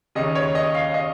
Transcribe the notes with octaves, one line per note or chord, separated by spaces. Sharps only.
D#2 C#3 D#5
C#5
D#5
F5
D#5